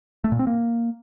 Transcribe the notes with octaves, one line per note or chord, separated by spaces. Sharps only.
A3
A#2
C4
A#3